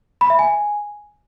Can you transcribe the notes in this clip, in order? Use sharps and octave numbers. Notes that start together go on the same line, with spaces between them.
B5
E5
G#5